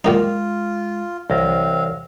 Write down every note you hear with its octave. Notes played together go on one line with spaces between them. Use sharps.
A#2 D#3 G#3 D#4 F4
C2 E3 C4 C#5 F5 A#6